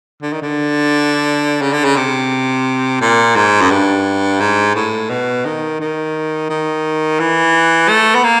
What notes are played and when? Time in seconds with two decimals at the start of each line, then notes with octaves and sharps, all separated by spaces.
0.22 D3
0.32 D#3
0.42 D3
1.62 C#3
1.73 D3
1.84 C#3
1.96 C3
3.01 A#2
3.36 G#2
3.61 F#2
3.71 G2
4.40 G#2
4.75 A2
5.10 B2
5.45 D#3
5.80 D#3
6.49 D#3
7.19 E3
7.88 A3
8.15 B3
8.24 A#3